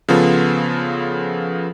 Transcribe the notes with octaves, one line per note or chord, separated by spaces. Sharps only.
C#3 F3 B3 F4 A4